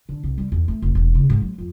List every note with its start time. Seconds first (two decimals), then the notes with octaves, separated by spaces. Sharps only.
0.09 D3
0.23 C2
0.38 G3
0.52 E2
0.68 A3
0.82 F1
0.95 E1
1.15 C#3
1.30 G#2
1.42 F#3
1.58 F2